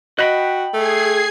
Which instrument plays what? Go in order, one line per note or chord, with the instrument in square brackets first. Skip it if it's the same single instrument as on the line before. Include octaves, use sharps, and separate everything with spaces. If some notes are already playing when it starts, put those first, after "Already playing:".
[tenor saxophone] F#4 [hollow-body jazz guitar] D#5 [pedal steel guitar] G5 B5 F#6
[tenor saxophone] A3 [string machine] G#4 G#6 C7